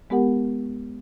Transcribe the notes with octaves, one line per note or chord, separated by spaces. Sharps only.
G#3 B3 G4 A#4 F#5